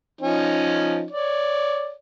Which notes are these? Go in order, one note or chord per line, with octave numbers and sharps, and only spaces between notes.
F3 C#4 D#4
C#5 D5